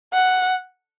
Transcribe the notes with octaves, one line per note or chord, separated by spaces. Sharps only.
F#5